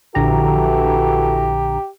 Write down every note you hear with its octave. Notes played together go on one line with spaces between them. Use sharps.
A#1 D3 E3 F#4 G4 A4 A#5